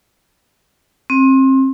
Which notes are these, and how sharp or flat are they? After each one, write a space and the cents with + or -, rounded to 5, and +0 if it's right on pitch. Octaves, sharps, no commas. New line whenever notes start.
C4 +30